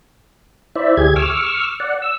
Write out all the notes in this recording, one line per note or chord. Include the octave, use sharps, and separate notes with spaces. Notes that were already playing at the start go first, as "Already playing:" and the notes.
E4 C5 D5 E5
D2 G4 G#4 G#6
C#6 D6 E6 F6
D5 F#5
E6